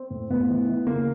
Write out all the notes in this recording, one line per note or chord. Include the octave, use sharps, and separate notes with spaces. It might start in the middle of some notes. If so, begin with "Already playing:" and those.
Already playing: C4
A2
A2 B3
E3
E3
C#3 A#3